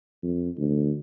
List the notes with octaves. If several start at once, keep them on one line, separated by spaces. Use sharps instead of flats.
F2
D2